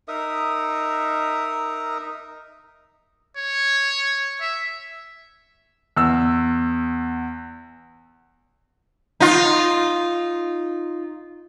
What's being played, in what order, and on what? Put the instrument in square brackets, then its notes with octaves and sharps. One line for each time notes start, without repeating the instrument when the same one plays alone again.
[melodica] D#4 A#4 E5 D#6
[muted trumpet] C#5
E5
[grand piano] E2 E6
[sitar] D#4 F4